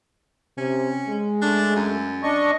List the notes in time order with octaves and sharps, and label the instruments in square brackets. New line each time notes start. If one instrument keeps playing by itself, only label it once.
[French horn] C3 [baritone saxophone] C#4
[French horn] G#3
[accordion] A3 [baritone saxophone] D4
[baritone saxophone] F#2
[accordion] D4 D#5 C#6